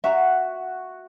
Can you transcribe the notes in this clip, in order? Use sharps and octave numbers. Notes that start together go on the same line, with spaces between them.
F#4 E5 A#5